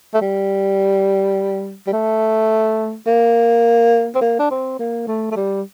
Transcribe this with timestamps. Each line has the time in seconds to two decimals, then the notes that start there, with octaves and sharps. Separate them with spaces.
0.14 A3
0.21 G3
1.87 G3
1.93 A3
3.07 A#3
4.15 C4
4.21 A#3
4.39 D4
4.51 C4
4.79 A#3
5.07 A3
5.31 A3
5.36 G3